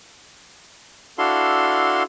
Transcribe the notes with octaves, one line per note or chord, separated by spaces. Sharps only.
D4 E4 F#4 A4 F5 C6